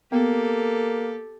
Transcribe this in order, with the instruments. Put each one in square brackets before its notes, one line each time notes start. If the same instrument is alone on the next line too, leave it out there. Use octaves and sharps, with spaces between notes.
[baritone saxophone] A#3 [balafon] B3 [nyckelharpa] G4 A4